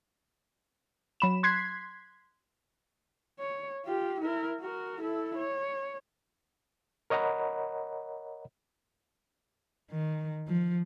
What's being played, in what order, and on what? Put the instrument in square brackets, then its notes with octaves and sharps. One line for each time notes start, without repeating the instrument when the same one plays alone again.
[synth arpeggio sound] F#3 B5 E7
C6 F#6 G#6 B6 C7
[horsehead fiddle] C#5
F4 G4
E4 A#4
F#4 A#4
E4 A4
C#5
[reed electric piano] A#4 C#5 D#5 F#5 A#5 B5
[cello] D#3
F3